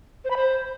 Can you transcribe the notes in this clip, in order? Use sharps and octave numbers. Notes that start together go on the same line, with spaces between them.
C5
B5
C5